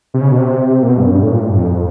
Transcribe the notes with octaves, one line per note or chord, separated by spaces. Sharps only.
C3
C#3
B2
C3
A#2
B2
G2
F#2
G2
A2
A#2
A2
G2
F2